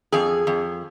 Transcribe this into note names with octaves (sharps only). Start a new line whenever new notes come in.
F2 G#4
F2